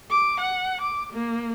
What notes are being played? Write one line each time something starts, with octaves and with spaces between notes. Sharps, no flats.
D6
F#5
D6
A#3